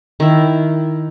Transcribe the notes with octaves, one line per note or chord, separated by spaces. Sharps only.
D#3 E4